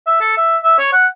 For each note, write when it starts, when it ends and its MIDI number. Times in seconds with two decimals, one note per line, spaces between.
0.07 0.16 76
0.21 0.36 69
0.37 0.57 76
0.64 0.76 76
0.79 0.89 73
0.93 1.06 78